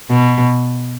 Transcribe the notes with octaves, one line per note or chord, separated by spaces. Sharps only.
B2